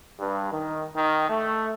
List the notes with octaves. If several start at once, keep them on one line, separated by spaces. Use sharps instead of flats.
G2
D#3
D#3
A3